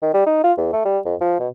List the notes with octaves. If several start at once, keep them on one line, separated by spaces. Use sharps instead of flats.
D#3
G3
D#4
F4
E2
A3
G3
F2
F3
B2